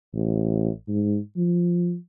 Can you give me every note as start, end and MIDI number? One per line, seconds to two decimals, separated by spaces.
0.14 0.70 33
0.88 1.18 44
1.37 1.96 53